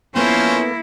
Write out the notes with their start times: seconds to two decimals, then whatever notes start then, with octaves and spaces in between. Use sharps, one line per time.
0.15 F3 A#3 B3 C#4 E4 A4 A#4 C5